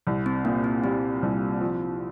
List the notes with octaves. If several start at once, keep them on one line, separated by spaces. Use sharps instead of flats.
C2
C4
A#2 A#3
C4
G3 C4
C2
F3